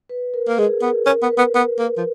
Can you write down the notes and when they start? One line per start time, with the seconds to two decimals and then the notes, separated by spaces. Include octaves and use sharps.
0.09 B4
0.34 A#4
0.48 A#3
0.58 G#3 G#4
0.82 B3 A#4
1.06 C#4 A#4
1.22 B3
1.30 B4
1.38 B3
1.55 B3
1.79 A#3
1.97 F3